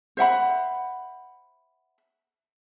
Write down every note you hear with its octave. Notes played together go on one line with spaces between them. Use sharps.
C5 E5 F#5 B5